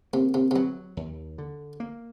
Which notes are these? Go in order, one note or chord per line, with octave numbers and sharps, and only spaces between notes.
C3 A#3
C3
C3
B2 F#3
D#2
D3
A#3